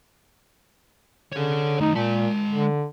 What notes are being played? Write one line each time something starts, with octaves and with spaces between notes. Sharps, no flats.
D3 G#4 C#5
D#3 A3 D#4
A#2 G#3 A5
D3